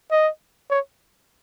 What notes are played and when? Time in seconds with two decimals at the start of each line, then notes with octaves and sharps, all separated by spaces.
0.11 D#5
0.70 C#5